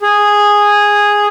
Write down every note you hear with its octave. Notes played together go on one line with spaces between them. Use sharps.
G#4